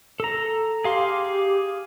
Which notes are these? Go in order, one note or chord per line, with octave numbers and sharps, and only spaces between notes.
A4 A#5
G4 G#4 F5 C6